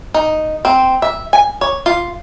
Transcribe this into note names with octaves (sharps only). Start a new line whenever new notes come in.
D#4
C4
E5
G#5
C#5
F4